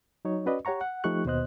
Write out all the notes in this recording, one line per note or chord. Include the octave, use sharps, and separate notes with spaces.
F#3 D#4 C#5
C#4 F#4 B4 D5 D#5
G4 C#5 F#5 A#5 C#6
F#5
F3 A3 D#4 G4 C#6 F#6
D#2 B2 B3 C5 D#5 F#6